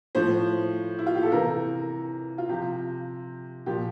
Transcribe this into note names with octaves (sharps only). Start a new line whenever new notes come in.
A2 F3 C5
E4
F4
G4
A4
C3 E3 A#4
F4
C3 F3 G4
A#2 F3 G4